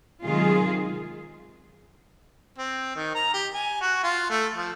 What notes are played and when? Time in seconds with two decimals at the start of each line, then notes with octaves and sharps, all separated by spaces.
0.24 C3 D#3 F#3 G#3 F4 G#4
2.58 C4
2.95 D#3
3.15 A#5
3.34 G4
3.54 G#5
3.81 F#4
4.03 F4
4.30 A3
4.55 F3